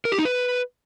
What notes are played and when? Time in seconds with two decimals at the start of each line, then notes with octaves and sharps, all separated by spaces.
0.05 A#4
0.12 G4
0.19 D#4
0.25 B4